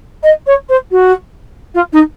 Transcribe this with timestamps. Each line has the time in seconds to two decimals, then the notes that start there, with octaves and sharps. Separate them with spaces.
0.23 D#5
0.46 C#5
0.69 C5
0.91 F#4
1.74 F4
1.92 D#4